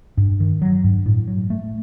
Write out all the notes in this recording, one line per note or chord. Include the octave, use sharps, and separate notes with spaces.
G2
D#3
F#3
G2
A2
F#3
A3